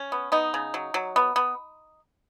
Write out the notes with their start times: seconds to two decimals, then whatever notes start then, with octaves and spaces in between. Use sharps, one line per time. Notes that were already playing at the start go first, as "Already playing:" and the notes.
Already playing: C#4
0.12 B3
0.32 B3 D#4
0.54 C#3
0.74 F#3
0.94 F#3
1.16 B3
1.36 B3